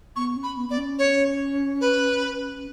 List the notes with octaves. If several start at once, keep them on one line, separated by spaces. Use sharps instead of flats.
B3 C#6
C#4
B5
B3
B3 D5
C#4
C#5
B4